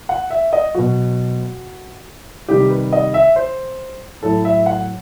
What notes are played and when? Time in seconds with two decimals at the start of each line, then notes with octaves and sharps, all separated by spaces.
0.09 F#5
0.30 E5
0.53 D#5
0.75 B2 F#3 F#4
2.48 C3 D#3 G3 G4
2.70 B4
2.93 D#5
3.14 E5
3.36 C5
4.23 A2 F#3 A4
4.45 E5
4.66 F#5